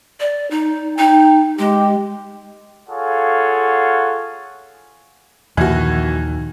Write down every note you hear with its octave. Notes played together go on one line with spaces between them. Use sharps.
D5
D#4
D#4 G5
G#3 G4
F4 G#4 A4 C#5 F5 F#5
A#1 D#2 D#3 E3 F#4